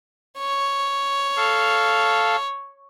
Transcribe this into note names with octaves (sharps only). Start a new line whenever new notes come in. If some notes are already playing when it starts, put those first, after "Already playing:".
C#5
A4 F5